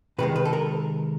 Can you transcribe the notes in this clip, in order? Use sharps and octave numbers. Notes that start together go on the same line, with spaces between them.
C3 D#3 G#3 B4
B4
A4
A#4